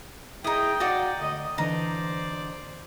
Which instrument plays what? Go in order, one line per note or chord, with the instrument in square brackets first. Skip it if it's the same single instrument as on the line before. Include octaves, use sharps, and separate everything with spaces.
[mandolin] D#4 D#5 [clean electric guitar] E4 G#4 [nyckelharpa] G5
[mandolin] D#4 D5 [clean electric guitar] F#4 F5 F#5
[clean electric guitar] D2 [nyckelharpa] D#5
[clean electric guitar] D3 E3 [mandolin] D#4 [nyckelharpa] C5 D5